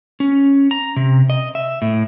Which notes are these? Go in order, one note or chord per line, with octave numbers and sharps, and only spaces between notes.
C#4
A#5
C3
D#5
E5
A2